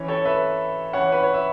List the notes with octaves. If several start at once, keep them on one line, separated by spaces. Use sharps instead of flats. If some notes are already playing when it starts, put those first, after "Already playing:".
Already playing: E3 C#4
A4 C#5
B4 E5
E3 C#4 C#5 F#5
B4
C#5
E5